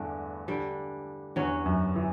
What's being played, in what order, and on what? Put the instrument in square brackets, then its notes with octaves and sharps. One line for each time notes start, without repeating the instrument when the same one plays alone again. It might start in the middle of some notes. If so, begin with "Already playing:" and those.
Already playing: [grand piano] E2 G2 [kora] D3 A3 D4
[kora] D3 G3 D4
[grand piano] E2 [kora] G2 F#3 C#4 F#4
[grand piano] F#2
E3